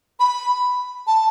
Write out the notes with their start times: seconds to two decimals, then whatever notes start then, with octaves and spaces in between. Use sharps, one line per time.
0.20 B5
1.07 A5